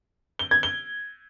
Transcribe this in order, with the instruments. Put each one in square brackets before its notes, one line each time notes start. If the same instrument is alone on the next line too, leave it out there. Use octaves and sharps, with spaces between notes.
[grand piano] G7
G#6
G7